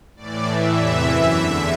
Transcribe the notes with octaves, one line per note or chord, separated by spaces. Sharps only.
A2 E3 D5
A2 E3 E5
E2 C3 E3
F#2 E3
E2 D3